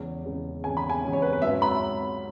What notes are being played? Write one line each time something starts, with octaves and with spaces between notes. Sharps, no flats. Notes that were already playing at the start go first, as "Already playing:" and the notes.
Already playing: E2 C#3 G#3 C#4
E2 C#3 G#3 C#4
E2 C#3 G#3 C#4 G#5
B5
G#5
E2 C#3 G#3 C#4
C#5
B4
B4
G#2 F#3 C#4 E5
B5